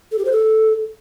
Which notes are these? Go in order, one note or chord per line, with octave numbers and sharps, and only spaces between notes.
A4
G4
C5
A4